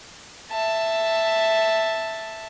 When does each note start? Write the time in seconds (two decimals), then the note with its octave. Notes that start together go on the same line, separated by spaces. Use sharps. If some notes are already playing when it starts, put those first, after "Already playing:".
0.52 E5 A5